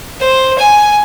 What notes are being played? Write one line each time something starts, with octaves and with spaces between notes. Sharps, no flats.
C5
G#5